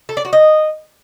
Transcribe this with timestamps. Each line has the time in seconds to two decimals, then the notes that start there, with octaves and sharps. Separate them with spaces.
0.09 A4
0.17 D5
0.25 F#4
0.33 D#5